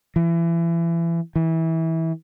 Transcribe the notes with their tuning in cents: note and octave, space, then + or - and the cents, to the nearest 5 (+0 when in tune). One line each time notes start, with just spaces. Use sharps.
E3 +30
E3 -20